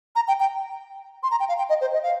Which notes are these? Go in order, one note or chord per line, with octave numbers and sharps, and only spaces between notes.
A#5
G5
G5
C6
A#5
G5
F5
G5
D#5
C5
D#5
F5